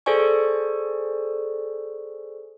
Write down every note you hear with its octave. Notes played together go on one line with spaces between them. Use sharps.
G#4 A4 C5 D5 G#5 C#6